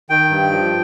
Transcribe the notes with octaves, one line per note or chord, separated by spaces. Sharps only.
D#3 G5
G2
F3